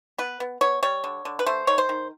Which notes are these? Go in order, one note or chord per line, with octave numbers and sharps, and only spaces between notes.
B3 B4
B3
B3 C#5
G3 C#5
D3
D3
B4
A3 C5
D#3 C#5
C5
D#3